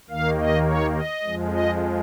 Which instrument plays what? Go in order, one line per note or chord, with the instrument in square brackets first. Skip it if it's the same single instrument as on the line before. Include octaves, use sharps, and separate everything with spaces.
[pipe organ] D#2 D#3 A#3 F5
D#5
C#5
D#5
F2 F3 G#3
D#5